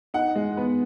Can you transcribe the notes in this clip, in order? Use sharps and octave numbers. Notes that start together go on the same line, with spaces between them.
D#4 F#5
G#3
B3